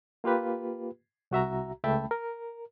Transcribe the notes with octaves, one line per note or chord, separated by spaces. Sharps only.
A#3 F4 G4 B4
C2 F#4 E5 A#5
C#2 A3 E5 G5 A5 B5
A#4